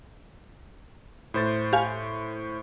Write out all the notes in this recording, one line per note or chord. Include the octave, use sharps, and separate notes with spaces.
A2 C5 A6
G4 F5 G#5